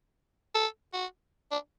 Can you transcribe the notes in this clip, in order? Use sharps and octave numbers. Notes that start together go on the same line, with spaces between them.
A4
F#4
D4